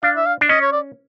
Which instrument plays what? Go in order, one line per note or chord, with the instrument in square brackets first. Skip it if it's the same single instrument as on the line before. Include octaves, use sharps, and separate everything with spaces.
[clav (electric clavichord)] D4 [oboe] F5
[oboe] E5
F5
[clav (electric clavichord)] D4
[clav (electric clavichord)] C#4 [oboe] D#5
[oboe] C#5
D5